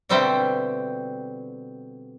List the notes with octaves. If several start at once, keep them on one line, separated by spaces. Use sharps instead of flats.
B2 D3 G3 C4 E5 G5